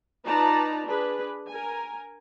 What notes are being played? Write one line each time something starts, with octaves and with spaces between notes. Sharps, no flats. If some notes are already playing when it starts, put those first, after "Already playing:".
D#4 F4 B4 D5 A5 A#5
D4 G#4 B4
A#4 G#5